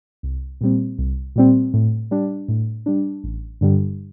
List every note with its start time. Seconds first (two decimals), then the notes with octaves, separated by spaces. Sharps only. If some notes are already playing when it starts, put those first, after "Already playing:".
0.23 C2
0.61 A#2 G3 C4
0.99 C2
1.36 A#2 G3 C4
1.74 A2
2.11 G3 D4
2.48 A2
2.86 G3 D4
3.24 A1
3.61 G2 D3 G3